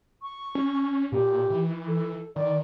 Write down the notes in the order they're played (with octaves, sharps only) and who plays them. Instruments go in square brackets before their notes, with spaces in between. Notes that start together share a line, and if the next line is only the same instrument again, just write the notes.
[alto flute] C#6
[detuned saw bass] C#4
[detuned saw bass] A#2 [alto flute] G4
[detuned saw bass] E3
[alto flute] A4
[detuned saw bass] D#3 [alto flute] D5